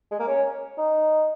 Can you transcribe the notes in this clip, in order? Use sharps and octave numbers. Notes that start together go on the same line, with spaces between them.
G#3
A#3
C#4
D#4